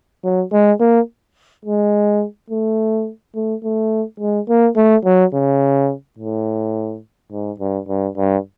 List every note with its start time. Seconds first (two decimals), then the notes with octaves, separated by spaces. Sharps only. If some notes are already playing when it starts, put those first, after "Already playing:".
0.24 F#3
0.52 G#3
0.80 A#3
1.65 G#3
2.50 A3
3.35 A3
3.63 A3
4.20 G#3
4.49 A#3
4.76 A3
5.05 F#3
5.33 C#3
6.19 A2
7.32 G#2
7.60 G2
7.88 G2
8.17 G2